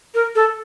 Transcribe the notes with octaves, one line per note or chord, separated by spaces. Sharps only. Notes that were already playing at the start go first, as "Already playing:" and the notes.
A#4
A4